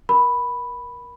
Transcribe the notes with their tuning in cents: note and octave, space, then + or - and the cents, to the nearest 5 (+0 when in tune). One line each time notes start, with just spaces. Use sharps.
A#4 +20 B5 +0